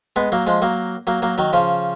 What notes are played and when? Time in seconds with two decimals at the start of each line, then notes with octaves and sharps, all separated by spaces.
0.16 G#3 B3
0.32 F#3 A#3
0.47 F3 G#3
0.62 F#3 A#3
1.07 F#3 A#3
1.22 F#3 A#3
1.38 D#3 F#3
1.53 C#3 F3